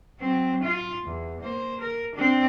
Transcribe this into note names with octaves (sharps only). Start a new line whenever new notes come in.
F#3 C4
F4
E2
A#3 C5
A#4
C4 D4